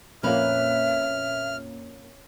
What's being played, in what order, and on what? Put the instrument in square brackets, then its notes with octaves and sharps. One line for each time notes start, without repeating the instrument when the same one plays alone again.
[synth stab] F2 A#2 A#3 [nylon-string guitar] C#4 B4 [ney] E5 [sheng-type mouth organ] F6